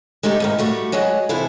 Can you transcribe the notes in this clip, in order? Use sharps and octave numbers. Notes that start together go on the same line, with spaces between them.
G#3 A3 D#4 G4 A4
E2 G#2 D#3
G3 A3 F#4
F#3 G#3 F#4 D#5
C3 E3 E4 G#4 A4